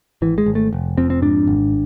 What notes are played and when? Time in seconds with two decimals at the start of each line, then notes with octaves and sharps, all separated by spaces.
0.22 G#1 E3
0.38 G#3
0.46 G#1
0.55 A3
0.73 F1
0.98 F2 C4
1.10 C4
1.22 G#2 D4
1.47 G#1